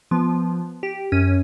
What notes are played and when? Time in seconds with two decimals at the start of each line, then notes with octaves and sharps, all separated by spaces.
0.11 F3 B3
0.83 G4
1.12 F#2 C#4 D#7